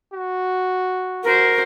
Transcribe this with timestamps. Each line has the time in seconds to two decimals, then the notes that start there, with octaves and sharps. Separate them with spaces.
0.13 F#4
1.24 F#4 A#4 C5